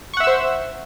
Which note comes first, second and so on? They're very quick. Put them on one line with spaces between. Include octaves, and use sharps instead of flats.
C#6 F#5 E5 E6 C5